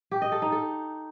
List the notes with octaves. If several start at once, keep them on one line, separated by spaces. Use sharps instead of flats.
G4
D#5
A4
D#4
A4